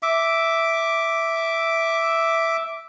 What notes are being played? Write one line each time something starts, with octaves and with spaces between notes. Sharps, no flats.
E5 D6